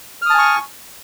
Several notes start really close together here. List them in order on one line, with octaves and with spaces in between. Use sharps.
F6 D#6 A5 G#5 C#6